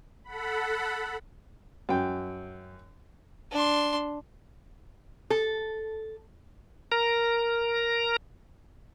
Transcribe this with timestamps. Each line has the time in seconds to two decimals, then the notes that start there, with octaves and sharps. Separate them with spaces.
0.24 A4 F#5 B5
1.89 F#2 G5
3.52 D4 C6
5.30 A4
6.92 A#4 A#5